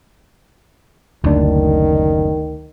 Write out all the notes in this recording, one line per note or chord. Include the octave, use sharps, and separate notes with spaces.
F#1 D2 D#3 D4